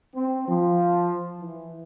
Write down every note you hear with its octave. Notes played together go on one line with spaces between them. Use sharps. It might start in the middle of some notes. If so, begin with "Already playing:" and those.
C4
F3
E3